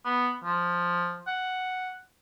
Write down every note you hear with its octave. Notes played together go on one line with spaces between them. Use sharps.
B3
F3
F#5